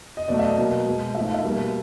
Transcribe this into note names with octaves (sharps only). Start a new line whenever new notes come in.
D#5
B2 F#3 A3 D5
E5
D#5
B2 F#3 A#3
B2 G#3
G#2 F3 A3 E5
F5
E5
B2 G3 A#3